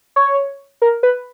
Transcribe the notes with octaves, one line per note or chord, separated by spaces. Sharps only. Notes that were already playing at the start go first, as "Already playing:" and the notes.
C#5
A#4
B4